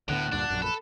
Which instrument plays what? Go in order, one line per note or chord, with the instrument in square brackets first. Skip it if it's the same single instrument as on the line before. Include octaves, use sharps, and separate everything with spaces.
[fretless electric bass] D2 D3 B3 [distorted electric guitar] A2 [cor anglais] F#5
[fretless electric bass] D2 G2 A#2 [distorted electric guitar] D4
[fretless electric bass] A#1 F#2
[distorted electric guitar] A4 [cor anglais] B4